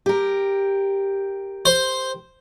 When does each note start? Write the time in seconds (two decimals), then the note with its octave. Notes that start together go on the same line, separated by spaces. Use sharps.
0.06 G4 A#4
1.65 C5